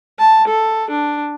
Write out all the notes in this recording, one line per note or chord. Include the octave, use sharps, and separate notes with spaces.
A5
A4
D4